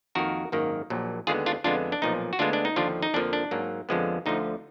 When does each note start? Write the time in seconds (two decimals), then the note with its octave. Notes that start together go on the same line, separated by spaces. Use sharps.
0.15 F2 D#3 A#3 F#4 A#4
0.52 G#1 F#2 D#3 A#3
0.90 A#1 A#2 F#3
1.27 D#2 D3 G#3 B3 F4 G#4
1.46 D4 F4
1.64 F2 D3 G#3 B3 D4 F4
1.92 D4
2.02 B1 A#2 F3 D#4
2.33 F#4
2.39 D2 D3 G#3 B3 D4 F4
2.53 D4
2.65 D#4
2.76 D#2 D3 F3 D4 F4
3.03 D#4
3.14 F2 D3 F3 A#3 D4
3.33 D4
3.51 G#2 F#3 A#3
3.89 F2 D3 F3 G#3 B3
4.26 D2 D3 F3 D#4